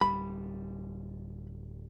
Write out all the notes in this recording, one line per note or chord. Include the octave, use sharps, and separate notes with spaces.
D1 C#2 G3 B5